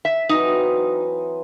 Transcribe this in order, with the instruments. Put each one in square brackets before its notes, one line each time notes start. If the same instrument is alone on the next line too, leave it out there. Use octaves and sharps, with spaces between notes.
[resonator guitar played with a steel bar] E5
[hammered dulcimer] E3 F#3 C4 [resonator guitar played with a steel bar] D#4